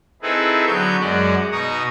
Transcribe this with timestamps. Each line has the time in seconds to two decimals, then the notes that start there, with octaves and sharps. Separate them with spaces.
0.22 C4 D#4 E4 G#4 A4 B4
0.67 D3 F#3 B3 C#6 G6
1.00 F#2 G#3 D5 F#5
1.52 B2 D#4 A#5 C#6 D#6